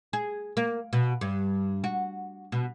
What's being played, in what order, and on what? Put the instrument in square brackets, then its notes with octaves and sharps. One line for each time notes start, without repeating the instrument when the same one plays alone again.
[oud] G#4
A#3
B2
G2
F#4
B2